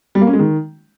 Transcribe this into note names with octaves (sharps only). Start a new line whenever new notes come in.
G3
A#3
C#4
G#3
D#3